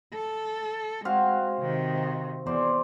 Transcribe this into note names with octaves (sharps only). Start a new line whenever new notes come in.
A4
G#3 C4 F#4 F5
C3 D#3
E2 C5 D5